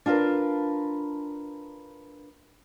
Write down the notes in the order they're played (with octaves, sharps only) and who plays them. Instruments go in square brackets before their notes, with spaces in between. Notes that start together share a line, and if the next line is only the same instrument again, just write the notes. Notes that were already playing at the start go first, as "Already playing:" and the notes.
[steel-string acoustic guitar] D4 F4 A#4 B4